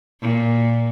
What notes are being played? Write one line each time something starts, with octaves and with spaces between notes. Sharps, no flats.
A#2